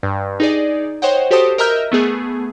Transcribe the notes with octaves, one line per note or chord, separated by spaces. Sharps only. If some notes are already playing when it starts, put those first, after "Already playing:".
G2
D#4 G#4 D5
C5 C#5 D#5 F#5 G5
F#4 G4 A4 C5 A5 D#6
A#4 D#5 E5 A#5 F6 G6
A3 B3 G#4